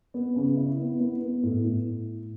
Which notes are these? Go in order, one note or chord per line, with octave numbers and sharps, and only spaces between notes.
B3
C#3
E4
B3
B3
B3
A2
A2